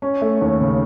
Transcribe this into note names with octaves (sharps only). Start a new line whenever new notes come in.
C#4
A3
D#2
C#3